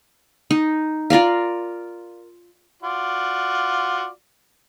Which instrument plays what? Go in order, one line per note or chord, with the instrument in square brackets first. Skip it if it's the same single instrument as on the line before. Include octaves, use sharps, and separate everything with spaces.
[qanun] D#4
F4 A#4 D5 F5
[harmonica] F4 F#4 D5